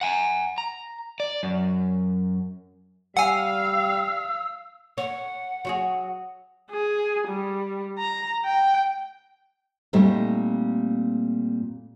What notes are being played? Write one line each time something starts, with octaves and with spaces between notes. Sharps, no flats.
F#5 G#5
A#5
D5
F#2
G3 F5 F#5 G#5 E6
C#5 F#5
F#3 F#4 G#4
G#4
G3
A#5
G5
A#2 G3 A3 C4 D#4